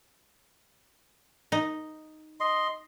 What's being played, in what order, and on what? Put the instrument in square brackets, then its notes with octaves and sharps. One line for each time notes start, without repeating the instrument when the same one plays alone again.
[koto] D#4
[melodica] D#5 C6